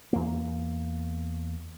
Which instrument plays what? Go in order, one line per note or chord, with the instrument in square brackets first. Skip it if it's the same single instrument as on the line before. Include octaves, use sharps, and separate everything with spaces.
[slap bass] E2 A#3